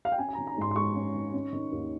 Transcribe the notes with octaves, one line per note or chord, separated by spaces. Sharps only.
F5
G5
C#4 G#5
G#5
A#5
D#3
A#5
G#2 C6
C6
G#3 C#6
C#4
D#3
C#4
D#3
D#2